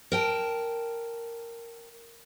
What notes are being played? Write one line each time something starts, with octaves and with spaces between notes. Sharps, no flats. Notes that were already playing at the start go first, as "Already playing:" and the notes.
A#4 G5 A5